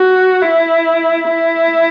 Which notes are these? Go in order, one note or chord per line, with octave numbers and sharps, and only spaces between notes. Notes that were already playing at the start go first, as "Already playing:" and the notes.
Already playing: F#4
E4
E4